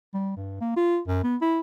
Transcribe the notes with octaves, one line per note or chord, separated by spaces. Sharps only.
G3
G2
A#3
F4
F#2
B3
E4